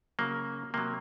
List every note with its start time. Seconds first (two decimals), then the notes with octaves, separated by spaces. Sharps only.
0.19 C#3 F#3 A#3
0.74 C3 F#3 A#3